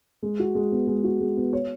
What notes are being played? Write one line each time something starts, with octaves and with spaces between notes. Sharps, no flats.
G#3
F#4
G#3
B3
G#3
F#4
G#3
B3
C#5